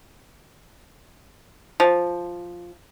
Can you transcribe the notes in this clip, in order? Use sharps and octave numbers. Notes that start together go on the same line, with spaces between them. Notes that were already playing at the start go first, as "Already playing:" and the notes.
F3